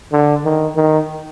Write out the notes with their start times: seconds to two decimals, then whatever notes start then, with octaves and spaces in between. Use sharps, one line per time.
0.12 D3
0.44 D#3
0.76 D#3